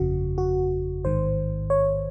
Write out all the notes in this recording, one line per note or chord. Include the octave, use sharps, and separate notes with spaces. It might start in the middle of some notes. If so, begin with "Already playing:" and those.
Already playing: G1 F2 C#3 F#4
F#4
A1 G#2 D#3 C5
C#5